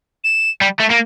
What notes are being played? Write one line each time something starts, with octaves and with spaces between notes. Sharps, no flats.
E7
G3
A3
A#3